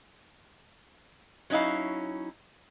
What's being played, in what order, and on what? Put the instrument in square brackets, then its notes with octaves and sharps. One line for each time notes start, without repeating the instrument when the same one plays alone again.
[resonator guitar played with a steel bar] F#3 C#4 D#4 E4 F5